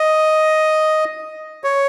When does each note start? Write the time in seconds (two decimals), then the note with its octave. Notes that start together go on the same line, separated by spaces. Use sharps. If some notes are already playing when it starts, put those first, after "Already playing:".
Already playing: D#5
1.64 C#5